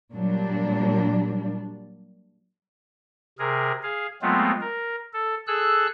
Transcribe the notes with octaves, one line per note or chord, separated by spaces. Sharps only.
A#2 F#3 G3 D4
C3 G#4 A#4
G#4 F5
F#3 G#3 A3 B3 C4 F4
A#4
A4
G#4 A4 E6 F#6